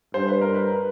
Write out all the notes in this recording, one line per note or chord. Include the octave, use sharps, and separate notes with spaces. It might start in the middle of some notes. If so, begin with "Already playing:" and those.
G2 C5
B4
A#4
B4